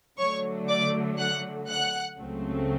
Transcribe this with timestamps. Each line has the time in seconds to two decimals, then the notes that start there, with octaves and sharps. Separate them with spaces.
0.18 D3 F#3 A3 C#5 C#6
0.69 D5 D6
1.18 F#5 F#6
1.68 F#5 F#6
2.18 C#2 C#3 F#3 A3 C4